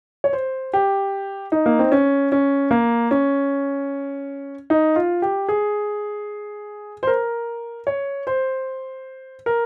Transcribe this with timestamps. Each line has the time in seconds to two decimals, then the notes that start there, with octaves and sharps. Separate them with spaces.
0.24 C#5
0.33 C5
0.73 G4
1.52 D#4
1.66 A#3
1.79 C4
1.92 C#4
2.32 C#4
2.71 A#3
3.11 C#4
4.70 D#4
4.96 F4
5.22 G4
5.49 G#4
7.03 C5
7.07 A#4
7.87 C#5
8.27 C5
9.46 A#4